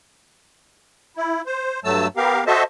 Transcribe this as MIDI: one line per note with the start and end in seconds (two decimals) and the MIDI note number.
1.17 1.41 64
1.46 1.80 72
1.84 2.07 43
1.84 2.07 54
1.84 2.07 57
1.84 2.07 81
1.84 2.07 88
2.17 2.44 59
2.17 2.44 67
2.17 2.44 70
2.17 2.44 77
2.47 2.63 66
2.47 2.63 69
2.47 2.63 72
2.47 2.63 75
2.47 2.63 76
2.47 2.63 81